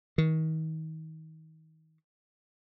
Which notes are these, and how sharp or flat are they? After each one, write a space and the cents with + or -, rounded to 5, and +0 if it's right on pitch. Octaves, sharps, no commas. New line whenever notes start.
D#3 +35